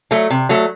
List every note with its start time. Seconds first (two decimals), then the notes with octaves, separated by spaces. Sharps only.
0.11 F#3 A3
0.30 C3
0.49 F#3 A3